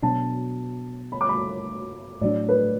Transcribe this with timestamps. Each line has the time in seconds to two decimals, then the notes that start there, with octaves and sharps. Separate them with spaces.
0.02 B2 F#3 D4 A5
1.12 B5
1.21 D6
1.29 B5
2.21 A2 F#3 D4 D5
2.49 B4